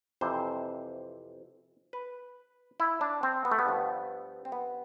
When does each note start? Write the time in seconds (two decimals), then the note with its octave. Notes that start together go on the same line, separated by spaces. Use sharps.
0.21 F2 C3 E3 C5
1.93 B4
2.80 E4
3.01 D4
3.23 C4
3.45 B3
3.51 A3
3.59 B3
3.66 G2 F3
4.45 C4
4.52 B3